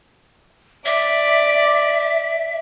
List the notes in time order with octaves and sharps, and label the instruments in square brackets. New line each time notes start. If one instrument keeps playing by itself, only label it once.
[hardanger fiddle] D5 [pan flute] E5